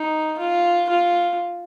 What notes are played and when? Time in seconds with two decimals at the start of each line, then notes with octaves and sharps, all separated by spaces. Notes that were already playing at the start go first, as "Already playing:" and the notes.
Already playing: D#4
0.39 F4
0.90 F4